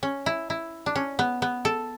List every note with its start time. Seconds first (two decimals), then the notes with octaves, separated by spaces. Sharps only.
0.03 C#4
0.26 E4
0.50 E4
0.86 D4
0.95 C#4
1.19 B3
1.42 B3
1.65 A4